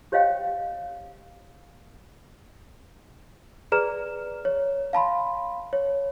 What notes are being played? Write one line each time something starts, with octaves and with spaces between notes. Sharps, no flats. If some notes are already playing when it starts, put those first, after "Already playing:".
G4 C5 C#5 D#5 F5 G5
G#4 B4 D5 A#5 F6 E7
C#5
F5 A5 B5 C6
C#5